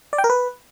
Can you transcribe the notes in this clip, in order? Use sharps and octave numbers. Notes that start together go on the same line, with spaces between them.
D5
G5
A#4
B4